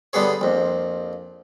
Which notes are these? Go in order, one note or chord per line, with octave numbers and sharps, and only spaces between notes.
D3 G3 B3 G#4 C#5
A#1 F2